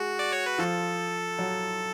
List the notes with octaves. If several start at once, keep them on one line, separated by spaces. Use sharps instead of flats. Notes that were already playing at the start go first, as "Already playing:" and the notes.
Already playing: G#3 F#4 G#4
D5
C#5
B4
F3 F4 A4
F#3 F#4